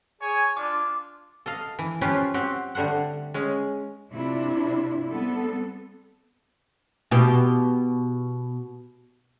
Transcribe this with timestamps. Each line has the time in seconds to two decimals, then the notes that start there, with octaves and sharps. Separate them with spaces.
0.21 G#4 C#5 G#5
0.57 D4 F4 D6
1.46 A4 D#5 F5
1.79 E3
2.01 F3 C#4 F4 G4 B4 C5
2.34 C4 F#4 G4 C5
2.75 D3 G3 A3 C5 F#5
3.34 G#3 C#4
4.13 C3 D4 E4 F4
5.10 G3 B3 C4 A4
7.11 B2 G4